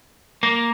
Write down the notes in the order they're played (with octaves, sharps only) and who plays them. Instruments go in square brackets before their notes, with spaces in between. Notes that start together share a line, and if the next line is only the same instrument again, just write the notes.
[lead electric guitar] A#3